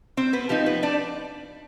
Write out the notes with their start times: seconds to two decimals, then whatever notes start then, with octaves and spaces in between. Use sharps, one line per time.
0.17 C4 C5
0.33 B3 B4
0.49 F3 C4 D#4 G4
0.66 B3 B4
0.83 D4 D5